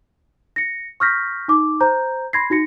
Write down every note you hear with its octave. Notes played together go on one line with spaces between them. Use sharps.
A#6 C#7
C#6 D#6 F6 G6 A#6 B6
D#4 D6
C5 A#5 G6
B5 C6 G#6 A#6 C7
D#4 F#4 A#6 C#7